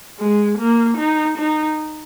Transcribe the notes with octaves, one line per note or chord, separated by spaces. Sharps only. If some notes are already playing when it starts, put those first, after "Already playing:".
G#3
A#3
D#4
D#4